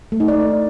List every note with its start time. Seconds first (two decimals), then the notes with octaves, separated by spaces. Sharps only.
0.12 A3
0.20 D#4
0.28 D5